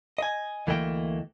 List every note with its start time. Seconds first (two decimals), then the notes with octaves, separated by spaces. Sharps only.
0.18 D#5 G#5
0.67 D2 E3 A3 A#3 D#5 G5